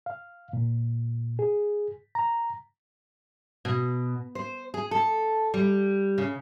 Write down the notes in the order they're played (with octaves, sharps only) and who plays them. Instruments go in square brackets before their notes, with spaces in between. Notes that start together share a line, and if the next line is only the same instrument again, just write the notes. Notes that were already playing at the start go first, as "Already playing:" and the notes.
[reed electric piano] F5
A#2
G#4
A#5
[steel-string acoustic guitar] B2
C5
G#4
A4
G3
C#3